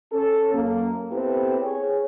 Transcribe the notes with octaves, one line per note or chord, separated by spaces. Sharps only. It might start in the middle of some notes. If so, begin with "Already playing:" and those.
C#4 A4
F#2 A#3
B3 C4 E4 G4 A4 B4
G#4 C#5